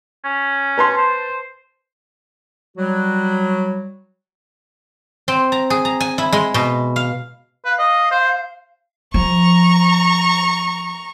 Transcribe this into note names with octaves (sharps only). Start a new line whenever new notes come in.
C#4
B4 A5 C6
C5
F#3 G3 F#4
C4
A#5
G#4
A#5
G#5
E4
G#3
B2
F5
B4 F5
D#5
C5
F3 A#5 C#6